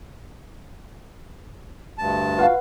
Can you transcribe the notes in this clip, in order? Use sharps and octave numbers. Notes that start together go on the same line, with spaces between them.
D2 G2 A5
F4 F#4 B4 F5 F#5